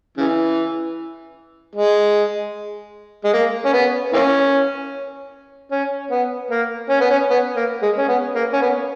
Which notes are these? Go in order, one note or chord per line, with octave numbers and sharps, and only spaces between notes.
C#3 E3
G#3
G#3
A#3
C#4
B3
E3 A#3 C#4
C#4
B3
A#3
C#4
B3
C#4
B3
A#3
G#3
C#4
B3
A#3
C#4
B3